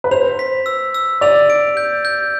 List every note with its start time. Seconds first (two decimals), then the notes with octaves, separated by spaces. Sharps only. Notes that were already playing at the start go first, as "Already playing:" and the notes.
0.04 B4
0.11 C5 F7
0.39 B6
0.66 E6
0.94 E6
1.21 D5 F7
1.50 D7
1.77 G6
2.05 G6